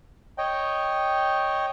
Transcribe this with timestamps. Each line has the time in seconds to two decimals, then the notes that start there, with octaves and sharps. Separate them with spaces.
0.38 C#5 D#5 G5